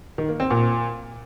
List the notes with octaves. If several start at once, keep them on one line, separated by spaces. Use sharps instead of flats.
D#3
A#3
C4
A#2